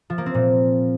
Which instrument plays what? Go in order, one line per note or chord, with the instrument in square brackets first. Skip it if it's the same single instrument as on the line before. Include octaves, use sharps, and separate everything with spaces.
[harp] F3
A#3
C4
A#2